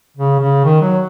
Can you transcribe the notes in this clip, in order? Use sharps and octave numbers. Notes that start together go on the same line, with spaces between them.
C#3
C#3
D#3
F#3